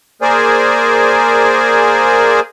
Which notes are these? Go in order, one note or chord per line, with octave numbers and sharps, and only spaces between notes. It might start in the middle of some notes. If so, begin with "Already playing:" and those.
A#3 G#4 A#4 C5 D5 G#5